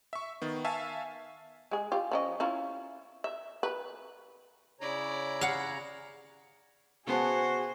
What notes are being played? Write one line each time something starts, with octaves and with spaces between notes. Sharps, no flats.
E5 C#6
D#3 B3
E5 F5 G#5 A5 C#6
G#3 G#4
F4 G4
F3 C#4 D#5
C#4 E4 F4
E5
B4
C#3 E4 C#5 D5 A#5
F5 F#5
C#3 B3 F#4 G#4 C5 A5